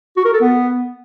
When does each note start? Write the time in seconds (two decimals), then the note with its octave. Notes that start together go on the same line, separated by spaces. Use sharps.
0.17 F#4
0.25 A#4
0.33 A4
0.41 B3